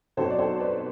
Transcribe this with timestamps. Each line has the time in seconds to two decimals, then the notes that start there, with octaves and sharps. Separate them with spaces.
0.17 B1 B2 F#3 C4 A4 C5
0.30 D5
0.39 A4 C5
0.59 B4 D5